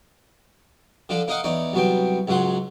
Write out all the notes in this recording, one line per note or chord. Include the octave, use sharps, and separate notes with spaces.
D3 F3 D4 A4
A#3 D#4 A#4 D#5 F5 F#5
E2 D#4 C#5 D5
C2 F#3 B3 C4 G5
C#2 G#2 F#3 F#5 C6